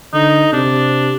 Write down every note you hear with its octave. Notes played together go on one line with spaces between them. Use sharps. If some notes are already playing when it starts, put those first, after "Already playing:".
D3 D#4
C3 D4